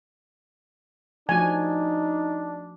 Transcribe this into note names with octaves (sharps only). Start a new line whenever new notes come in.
F3 A3 D4 D#4 F#4 G#5